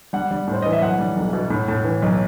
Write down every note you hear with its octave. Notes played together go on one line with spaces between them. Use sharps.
G3 F#5
G3
A2 C5
E3 D#5
E5
B1 F#5
G3
B1
B2
A2
A2
E3
B1